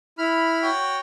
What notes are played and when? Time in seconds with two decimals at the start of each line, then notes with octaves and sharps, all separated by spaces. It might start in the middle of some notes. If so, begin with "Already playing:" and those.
0.18 E4 B5 F6
0.62 F#4 C#5 G5